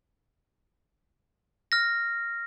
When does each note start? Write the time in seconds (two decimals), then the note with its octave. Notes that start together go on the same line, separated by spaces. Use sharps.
1.72 F6 A#6